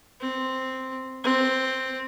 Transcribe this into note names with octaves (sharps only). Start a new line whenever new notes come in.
C4
C4